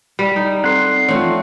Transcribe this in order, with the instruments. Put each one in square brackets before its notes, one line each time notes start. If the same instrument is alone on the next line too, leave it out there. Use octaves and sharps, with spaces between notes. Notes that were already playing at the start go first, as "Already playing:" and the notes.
[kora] G3
D#4
[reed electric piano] C4 A4 [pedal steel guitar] F#5 C6
[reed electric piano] E3 C#5 [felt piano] F3 A3 C#7 [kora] C4